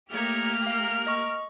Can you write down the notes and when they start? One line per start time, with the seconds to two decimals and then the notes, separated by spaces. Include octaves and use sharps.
0.13 A3 A#3 D#4 G4 C#5 F6
0.67 A#4 F5
1.07 D#5 C#6